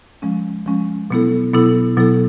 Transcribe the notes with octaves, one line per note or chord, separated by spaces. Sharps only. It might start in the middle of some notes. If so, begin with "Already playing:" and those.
F3 G#3 C#4
F3 G#3 C#4
B2 F#3 B3 E4 A4
B2 F#3 B3 E4 A4
B2 F#3 B3 E4 A4